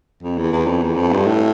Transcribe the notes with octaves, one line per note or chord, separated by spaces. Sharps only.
F2
E2
E2
F2
E2
F2
G2
A2